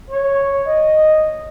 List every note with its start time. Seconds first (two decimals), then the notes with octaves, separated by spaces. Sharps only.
0.10 C#5
0.66 D#5